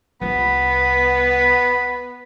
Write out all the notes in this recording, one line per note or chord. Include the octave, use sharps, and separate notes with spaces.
C2 B3 F4 B5